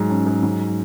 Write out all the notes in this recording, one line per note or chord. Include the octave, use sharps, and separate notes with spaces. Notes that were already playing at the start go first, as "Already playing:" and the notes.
Already playing: G#2 F#3
C#4
G#2
F#3